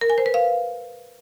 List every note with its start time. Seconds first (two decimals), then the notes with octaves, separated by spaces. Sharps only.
0.01 A#4
0.10 G#5
0.18 C5
0.26 B4
0.34 F5